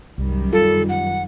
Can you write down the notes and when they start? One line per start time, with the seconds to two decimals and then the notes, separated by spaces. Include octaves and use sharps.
0.18 C2 F#2 D#3 G3
0.53 F4 A4
0.89 F#5